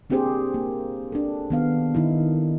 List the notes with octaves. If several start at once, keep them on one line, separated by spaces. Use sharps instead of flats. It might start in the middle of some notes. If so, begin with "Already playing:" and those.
A#3 C4 D4 G4 G#4 C5
A#3
D4 A4
D#3 B3 F5
D#3 D#4 E4